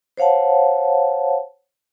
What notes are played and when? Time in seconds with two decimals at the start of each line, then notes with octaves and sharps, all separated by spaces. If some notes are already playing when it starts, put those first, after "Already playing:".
0.17 C5 C#5 F5 F#5 A5